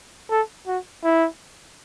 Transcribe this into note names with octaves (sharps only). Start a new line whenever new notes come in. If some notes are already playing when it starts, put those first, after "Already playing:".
A4
F#4
E4